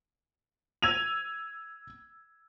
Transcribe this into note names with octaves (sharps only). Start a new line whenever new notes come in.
E6 G#6 D#7 F7